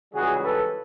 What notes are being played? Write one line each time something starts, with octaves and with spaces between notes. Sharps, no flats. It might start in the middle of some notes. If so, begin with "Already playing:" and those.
C#2 C#3 E3 G3 F#4 G#4
A4 B4